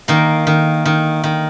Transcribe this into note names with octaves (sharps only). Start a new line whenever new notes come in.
D#3 A#3
D#3
D#3
D#3